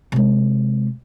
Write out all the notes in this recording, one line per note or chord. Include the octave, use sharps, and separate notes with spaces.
C3 G#3